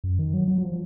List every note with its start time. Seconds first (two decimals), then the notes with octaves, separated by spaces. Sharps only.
0.04 F#2
0.19 D#3
0.34 F#3
0.48 F#3
0.58 F#3
0.63 F3